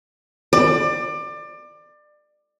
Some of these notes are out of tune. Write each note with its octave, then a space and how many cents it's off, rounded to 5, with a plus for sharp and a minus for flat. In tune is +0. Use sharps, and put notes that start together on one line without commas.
D5 +25